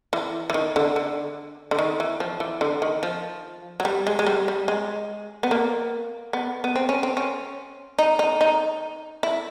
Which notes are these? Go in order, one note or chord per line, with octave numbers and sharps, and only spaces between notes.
E3
E3
D#3
D3
D3
D3
D#3
E3
F3
E3
D3
D#3
F3
F#3
G3
G#3
G#3
G3
G3
G#3
B3
A#3
B3
B3
C4
C#4
C4
C#4
D#4
D#4
D#4
E4